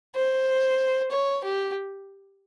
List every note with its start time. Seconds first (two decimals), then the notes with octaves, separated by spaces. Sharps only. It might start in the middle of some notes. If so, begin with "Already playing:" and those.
0.16 C5
1.11 C#5
1.44 G4